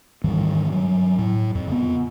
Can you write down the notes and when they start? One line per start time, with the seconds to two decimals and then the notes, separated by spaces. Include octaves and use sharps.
0.24 G#2 D#3 E3 G3
0.71 G2 F#3
1.18 A2
1.55 F2
1.67 C#3 B3